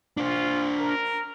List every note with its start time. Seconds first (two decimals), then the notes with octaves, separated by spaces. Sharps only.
0.17 D4 F4 C5
0.80 A#4